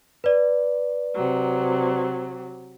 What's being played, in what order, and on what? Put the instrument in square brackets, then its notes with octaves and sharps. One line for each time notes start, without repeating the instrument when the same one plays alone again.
[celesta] B4 D5
[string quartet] C3 F#3